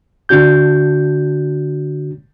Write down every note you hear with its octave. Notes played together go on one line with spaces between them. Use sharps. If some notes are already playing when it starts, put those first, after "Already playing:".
D3 D4 F#4 G6